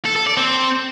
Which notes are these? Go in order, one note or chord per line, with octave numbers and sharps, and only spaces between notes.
A4
A4
D5
C4